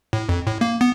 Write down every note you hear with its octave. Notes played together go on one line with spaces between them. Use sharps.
A2
F2
A2
A#3
B3